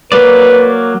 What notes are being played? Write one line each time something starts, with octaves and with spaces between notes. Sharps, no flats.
F#3 A#3 B4 D5